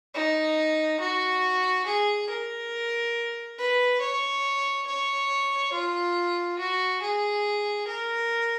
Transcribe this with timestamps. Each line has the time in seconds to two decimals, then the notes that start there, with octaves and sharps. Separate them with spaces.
0.14 D#4
1.00 F#4
1.86 G#4
2.29 A#4
3.58 B4
4.00 C#5
4.87 C#5
5.73 F4
6.59 F#4
7.02 G#4
7.87 A#4